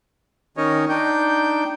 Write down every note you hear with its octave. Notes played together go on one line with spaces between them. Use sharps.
D#3 C#4 D#4 A#4 C#5 D#5
D4 D#4 G5 G6